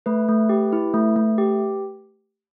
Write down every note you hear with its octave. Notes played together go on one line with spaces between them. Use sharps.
A3 B4
A3
G4
E4
A3
A3
G4